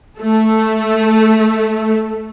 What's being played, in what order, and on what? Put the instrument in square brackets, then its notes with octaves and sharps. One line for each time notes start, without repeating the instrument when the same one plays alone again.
[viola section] A3 A4